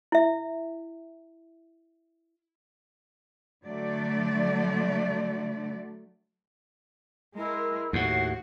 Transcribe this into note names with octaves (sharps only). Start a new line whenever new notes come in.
E4 E5
D3 F#3 A3 D5
G#3 E4 A#4
D#2 A2 F#4 F#5 C7